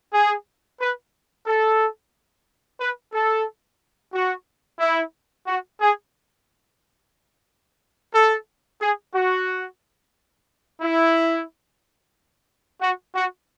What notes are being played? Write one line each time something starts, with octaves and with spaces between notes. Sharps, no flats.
G#4
B4
A4
B4
A4
F#4
E4
F#4
G#4
A4
G#4
F#4
E4
F#4
F#4